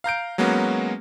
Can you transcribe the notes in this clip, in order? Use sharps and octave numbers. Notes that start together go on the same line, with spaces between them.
F5 A#5 G6 D7
F#3 G#3 A#3 B3 C#4 F#4